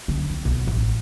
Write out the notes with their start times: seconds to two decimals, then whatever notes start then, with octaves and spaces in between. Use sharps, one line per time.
0.08 D3 C#4
0.30 C4
0.45 B1 B2
0.67 A1